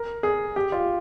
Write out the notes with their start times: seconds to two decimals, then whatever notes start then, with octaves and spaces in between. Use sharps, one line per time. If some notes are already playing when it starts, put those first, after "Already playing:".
Already playing: A#4
0.23 G#4
0.56 G4
0.72 F4